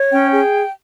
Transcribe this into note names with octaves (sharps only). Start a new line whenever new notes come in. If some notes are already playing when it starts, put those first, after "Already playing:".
Already playing: C#5
C#4 G5
G#4